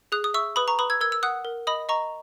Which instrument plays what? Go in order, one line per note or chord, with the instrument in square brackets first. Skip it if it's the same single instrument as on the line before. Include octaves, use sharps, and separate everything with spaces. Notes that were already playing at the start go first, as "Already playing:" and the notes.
[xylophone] G#4 D#6 F#6
D#6
E5 C#6 E6
B4 B5 D#6
A#5 C#6
B4 B5 D#6
E6 G#6
A#4 E6 G#6
E6
F#5 D#6 F#6
A#4
D#5 B5 D#6
D#5 A#5 C#6